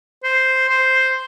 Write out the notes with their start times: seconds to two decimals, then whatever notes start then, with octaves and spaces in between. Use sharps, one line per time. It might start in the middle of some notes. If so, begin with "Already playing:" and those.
0.24 C5
0.69 C5